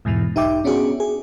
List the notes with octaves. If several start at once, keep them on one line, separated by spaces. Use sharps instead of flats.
E2 G#2 B2 E3
B1 D#4 G4 E5 G5 D6
B3 C#4 D4 F#4 G#4
G#4